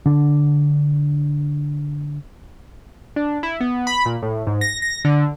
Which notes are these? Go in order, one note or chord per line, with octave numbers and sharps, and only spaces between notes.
D3 D4
D4
E4
B3
B5
A#2
A2
G#2
A#6
A#6
D3